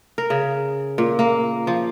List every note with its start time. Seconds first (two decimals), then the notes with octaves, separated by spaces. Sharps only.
0.18 A#4
0.30 C#3
0.98 A#2
1.19 A#3
1.67 F3